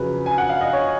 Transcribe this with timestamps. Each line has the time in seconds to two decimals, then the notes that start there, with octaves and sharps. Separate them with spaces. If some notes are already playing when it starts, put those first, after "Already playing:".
Already playing: F2 C#3 F#3 B4
0.26 G#5
0.38 F#5
0.49 F5
0.61 D#5
0.73 C#5